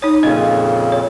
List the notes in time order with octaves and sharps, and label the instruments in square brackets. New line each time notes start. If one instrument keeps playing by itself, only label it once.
[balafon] D#4 C#5 [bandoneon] D#6
[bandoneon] F2 A#2 C#3 [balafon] C#4 D#5
[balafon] C#5